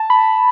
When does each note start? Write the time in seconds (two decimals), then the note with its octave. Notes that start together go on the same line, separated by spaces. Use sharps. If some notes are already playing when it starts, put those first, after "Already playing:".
Already playing: A5
0.10 B5